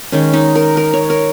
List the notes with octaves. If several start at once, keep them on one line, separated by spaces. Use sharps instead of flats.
D#3 G#3 C#4
D#4
A#4
A#4
C#5
A#4